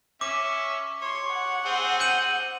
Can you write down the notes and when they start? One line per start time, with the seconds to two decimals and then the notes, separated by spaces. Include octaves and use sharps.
0.21 C#4 E5 D6
1.02 C#5 C6
1.33 F#5
1.65 C4 G#4 C5
2.00 G6 D#7 F#7